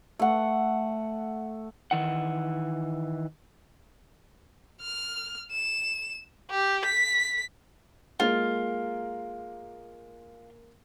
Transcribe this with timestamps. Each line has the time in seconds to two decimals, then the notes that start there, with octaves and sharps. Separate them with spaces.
0.19 A3 F#5
1.91 D#3 E3 F#5
4.81 F6
5.52 E7
6.50 G4
6.85 B6
8.20 G#3 A#3 F4 A#4